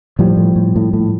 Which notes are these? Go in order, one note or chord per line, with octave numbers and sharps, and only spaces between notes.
A2 F3 G3
A2
A2
A2
A2